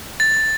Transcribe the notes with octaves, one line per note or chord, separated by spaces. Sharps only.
A6